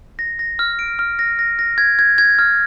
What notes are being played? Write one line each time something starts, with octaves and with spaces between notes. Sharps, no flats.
A#6
A#6
F6
D7
F6
A#6
A#6
A#6
G#6
G#6
G#6
F6